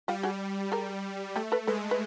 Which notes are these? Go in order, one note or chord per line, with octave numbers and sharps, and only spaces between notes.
G3 F4 G4
F#4 G#4
G#4 A#4
A3 G4 A4
A4 B4
G#3 A4 B4
B4